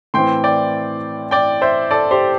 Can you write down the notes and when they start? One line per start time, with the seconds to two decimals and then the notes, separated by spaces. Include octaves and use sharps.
0.14 A2 E3 C4 G5 C6
0.44 D5 G5
1.31 D5 G5
1.62 C5 E5
1.91 A4 D5
2.11 G4 C5